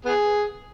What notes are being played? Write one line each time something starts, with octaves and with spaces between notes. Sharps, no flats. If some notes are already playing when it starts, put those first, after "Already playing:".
B3 G#4